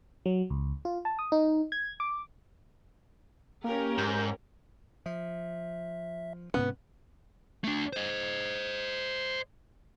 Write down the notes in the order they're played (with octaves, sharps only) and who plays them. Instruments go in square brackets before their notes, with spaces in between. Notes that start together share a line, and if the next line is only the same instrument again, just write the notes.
[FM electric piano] F#3
C#2
F4
A5
D#6
D#4
G#6
D6
[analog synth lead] A#3 [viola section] C#4 G4 A#4
[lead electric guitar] G#2 [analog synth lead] G6
[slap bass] F3 [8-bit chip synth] E5
[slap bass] G#2 C3 C#4 [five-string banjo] B3
[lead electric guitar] A3 D4
C5 D#5